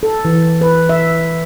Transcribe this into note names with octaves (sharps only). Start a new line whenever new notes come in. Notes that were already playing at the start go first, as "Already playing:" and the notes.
A4
E3
B4
E5